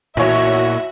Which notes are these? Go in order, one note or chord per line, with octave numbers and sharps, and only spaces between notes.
B1 A#2 E3 F#4 C#5 E5